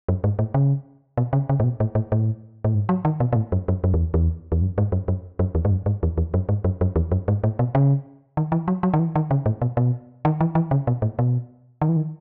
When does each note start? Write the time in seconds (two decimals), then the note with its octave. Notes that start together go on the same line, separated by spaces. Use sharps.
0.09 F#2
0.24 G#2
0.39 A2
0.54 C#3
1.17 B2
1.33 C#3
1.49 C#3
1.60 A2
1.64 B2
1.80 A2
1.95 A2
2.12 A2
2.64 A2
2.75 G#2
2.89 F#3
3.05 D#3
3.20 B2
3.33 B2
3.36 A2
3.52 F#2
3.68 F#2
3.84 F#2
3.94 E2
4.14 E2
4.52 E2
4.62 F#2
4.78 G#2
4.92 F#2
5.08 F#2
5.39 F#2
5.55 E2
5.65 G#2
5.71 F#2
5.86 G#2
6.03 E2
6.18 E2
6.34 F#2
6.49 G#2
6.64 F#2
6.81 F#2
6.96 E2
7.12 F#2
7.28 G#2
7.44 A2
7.59 B2
7.75 C#3
8.37 D#3
8.52 E3
8.68 F#3
8.83 F#3
8.94 D#3
8.99 E3
9.16 D#3
9.31 C#3
9.46 A2
9.62 B2
9.77 B2
10.25 D#3
10.41 E3
10.55 E3
10.71 C#3
10.87 B2
11.02 A2
11.19 B2
11.82 D#3
11.89 E3
11.97 D#3